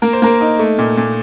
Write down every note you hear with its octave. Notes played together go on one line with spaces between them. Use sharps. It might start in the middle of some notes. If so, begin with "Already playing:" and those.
A#3 A#4
C5
A#3 A#4
D#4
A3
A#2
A#2